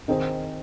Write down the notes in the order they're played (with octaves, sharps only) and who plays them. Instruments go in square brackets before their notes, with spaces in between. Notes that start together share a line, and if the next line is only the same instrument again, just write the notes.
[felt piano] D#3 C4 D#4 G#4 C5